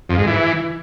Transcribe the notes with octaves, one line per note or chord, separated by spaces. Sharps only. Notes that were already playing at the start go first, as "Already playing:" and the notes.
F2
G#2
E3